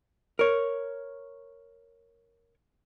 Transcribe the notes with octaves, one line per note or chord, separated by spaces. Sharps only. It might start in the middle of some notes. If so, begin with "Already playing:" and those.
A#4 C#5